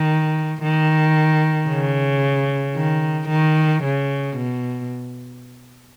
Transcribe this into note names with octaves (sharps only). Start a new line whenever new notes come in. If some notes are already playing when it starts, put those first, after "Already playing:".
Already playing: D#3
D#3
C#3
D#3
D#3
C#3
B2